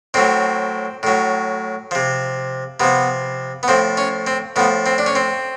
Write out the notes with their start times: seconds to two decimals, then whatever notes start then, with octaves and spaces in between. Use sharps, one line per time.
0.14 A2 F#3 C4
1.03 A2 F#3
1.91 C3 F3
2.80 C3 F3 B3
3.63 B3
3.68 A2 F3 C4
3.97 C#4
4.27 C4
4.56 A2 F3 B3
4.86 C4
4.98 D4
5.06 C#4
5.15 C4